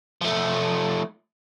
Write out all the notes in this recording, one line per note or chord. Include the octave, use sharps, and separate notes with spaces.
F3 A3